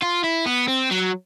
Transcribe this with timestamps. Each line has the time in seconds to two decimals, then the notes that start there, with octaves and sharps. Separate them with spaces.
0.03 F4
0.24 E4
0.46 B3
0.68 C4
0.91 F#3